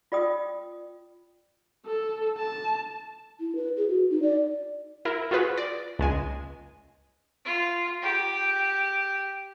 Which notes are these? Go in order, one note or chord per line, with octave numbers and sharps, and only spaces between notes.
F4 D5 G5 D#6
A4
A5
E4
B4
G#4
F#4
D#4
D5
E4 A#4
F4 F#4 G#4 B4
D5
C#2 G#3 G#5
F4
G4